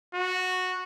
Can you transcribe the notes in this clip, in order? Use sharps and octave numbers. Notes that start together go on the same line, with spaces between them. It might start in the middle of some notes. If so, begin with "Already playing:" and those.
F#4